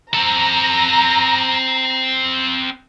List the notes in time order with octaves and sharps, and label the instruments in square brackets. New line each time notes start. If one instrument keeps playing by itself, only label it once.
[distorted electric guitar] C4 A4 [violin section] A#5